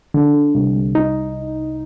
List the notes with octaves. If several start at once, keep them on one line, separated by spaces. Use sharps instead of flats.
D3
D3
C2
C2
D#4